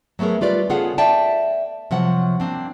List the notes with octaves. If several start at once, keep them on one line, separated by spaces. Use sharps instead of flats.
F#3 A3 B3 G#4 A#4
G3 F4 B4 D5
C#3 B3 F4 G#4 A4 F#5
D5 E5 G5 A5
C3 F3 F#3 F#5
A#3 C4 D4